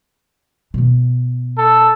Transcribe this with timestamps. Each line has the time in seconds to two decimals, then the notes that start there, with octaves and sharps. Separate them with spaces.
0.74 B2 B3
1.58 A4